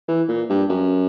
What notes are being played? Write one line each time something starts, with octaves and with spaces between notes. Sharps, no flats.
E3
A#2
G2
F#2